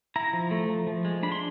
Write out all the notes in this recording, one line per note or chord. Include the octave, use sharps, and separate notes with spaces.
E4 A#5
F3
A3
F3
F3
G#3
D4 B5
C6